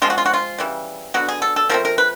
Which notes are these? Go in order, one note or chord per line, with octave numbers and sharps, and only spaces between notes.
F3 G#3 C4 F4
F#4
F4
F#4
F4
C#3 E3 G3
D3 F#3 B3 F#4
G#4
A4
A4
F3 A3 C4 A#4
A#4
B4